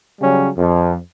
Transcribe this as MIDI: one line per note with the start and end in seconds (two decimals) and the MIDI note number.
0.21 0.49 49
0.21 0.49 54
0.21 0.49 55
0.21 0.49 61
0.58 0.95 41